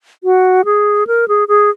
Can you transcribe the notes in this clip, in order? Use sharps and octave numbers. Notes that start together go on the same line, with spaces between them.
F#4
G#4
A#4
G#4
G#4